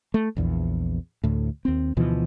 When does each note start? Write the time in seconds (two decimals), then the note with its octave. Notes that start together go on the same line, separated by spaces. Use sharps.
0.14 A3
0.37 A#1 E2
1.24 D2 A2
1.65 D#2 C4
1.97 D2 B2 E3 F3